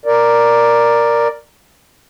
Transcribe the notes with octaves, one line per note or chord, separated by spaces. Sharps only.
A#4 D5